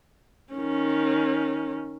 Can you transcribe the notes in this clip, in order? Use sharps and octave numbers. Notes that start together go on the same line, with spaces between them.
D#3 C#4